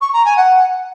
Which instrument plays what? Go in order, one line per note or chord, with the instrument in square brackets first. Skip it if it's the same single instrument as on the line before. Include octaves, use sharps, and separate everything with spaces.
[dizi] C#6
A#5
G#5
F#5